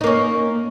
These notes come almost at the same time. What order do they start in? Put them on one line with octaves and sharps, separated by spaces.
D#4 A#3 C#4